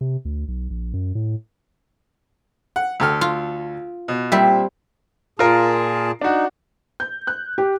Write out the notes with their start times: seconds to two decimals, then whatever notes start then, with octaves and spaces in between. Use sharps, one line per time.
0.01 C3
0.25 D2
0.48 B1
0.70 A#1
0.93 F#2
1.15 A2
2.76 F#5
3.00 D2 A4 F6
3.21 F4
4.08 B2
4.32 A#2 G3 C4 E5
5.39 A#2 F4 G#4 A#4 A5
6.21 D4 D#4 F#4
7.00 G6
7.27 F#6
7.58 G4